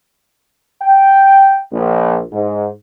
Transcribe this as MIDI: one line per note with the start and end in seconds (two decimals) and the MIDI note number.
0.82 1.60 79
1.73 2.21 34
2.32 2.69 44